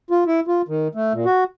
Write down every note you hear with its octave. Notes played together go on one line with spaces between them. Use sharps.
F4
E4
F4
D#3
A3
A#2
F#4